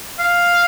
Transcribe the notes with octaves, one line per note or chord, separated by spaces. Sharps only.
F5